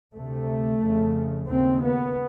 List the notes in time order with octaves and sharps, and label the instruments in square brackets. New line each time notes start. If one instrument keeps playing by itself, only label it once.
[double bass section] D2 C3 A3
F2 C#3
D#2 C#3 C4
B3